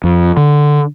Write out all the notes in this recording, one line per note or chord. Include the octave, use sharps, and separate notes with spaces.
F2
D3